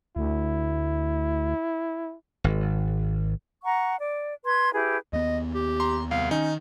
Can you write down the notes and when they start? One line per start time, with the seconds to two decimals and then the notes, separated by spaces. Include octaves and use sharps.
0.16 D2 E4
2.44 G#1
3.64 F#5 A#5 C#6
3.99 D5
4.45 B4 C6 G#6
4.72 E4 G4 G#4 B4
5.13 D#2 B3 D#5
5.55 G4
5.80 A#5 C6
6.11 C2 F5
6.31 D#3 C#4 D#4